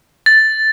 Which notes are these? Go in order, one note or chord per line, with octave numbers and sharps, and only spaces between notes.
A6